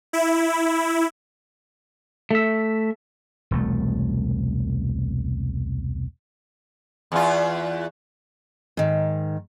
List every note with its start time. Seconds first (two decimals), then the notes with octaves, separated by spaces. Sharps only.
0.13 E4
2.31 A3 E5
3.51 E1 C2 A3
7.12 E2 F4
8.77 G#2 D#3